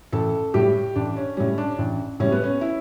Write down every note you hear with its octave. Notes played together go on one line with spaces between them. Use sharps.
A1 A4
A2 G3 G4
A1 D4
C#4
A2 G3 C#4
D4
A1
A2 G3 C#4
B3
C#4
E4